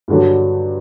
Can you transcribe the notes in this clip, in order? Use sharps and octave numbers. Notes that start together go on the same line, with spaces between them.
G2 D3 F#3